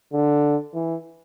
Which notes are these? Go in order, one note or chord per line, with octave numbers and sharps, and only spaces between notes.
D3
E3